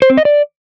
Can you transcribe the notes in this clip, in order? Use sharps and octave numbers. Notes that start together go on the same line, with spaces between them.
C5
C4
D#5
D5